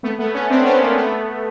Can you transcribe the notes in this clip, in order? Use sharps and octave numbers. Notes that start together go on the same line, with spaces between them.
A3 B3
A3 B3
B3 C#4
C4 D4
B3 C#4
A#3 C4
A3 B3